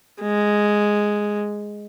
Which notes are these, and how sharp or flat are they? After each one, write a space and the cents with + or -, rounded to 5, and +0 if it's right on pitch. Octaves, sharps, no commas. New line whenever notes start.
G#3 +0